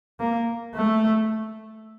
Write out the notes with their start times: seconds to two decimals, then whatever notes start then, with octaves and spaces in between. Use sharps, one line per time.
0.20 A#3
0.75 A3